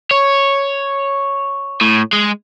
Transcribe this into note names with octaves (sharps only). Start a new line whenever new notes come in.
C#5
A2
G#3